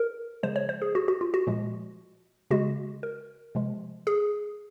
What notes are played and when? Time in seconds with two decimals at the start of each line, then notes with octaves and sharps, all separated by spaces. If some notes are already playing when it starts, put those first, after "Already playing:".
Already playing: A#4
0.43 C#3 F3 G#3 C5
0.56 C#5
0.69 C5
0.82 G#4
0.95 F#4
1.08 F#4
1.21 F4
1.34 F#4
1.47 A#2 F3 G#3
2.51 C#3 G#3 F#4
3.03 A#4
3.55 C3 F3 G#3
4.07 G#4